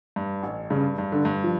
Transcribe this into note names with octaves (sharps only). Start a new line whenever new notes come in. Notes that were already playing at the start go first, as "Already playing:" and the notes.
G2
A1
G2 C#3
G2
D3
G2
F3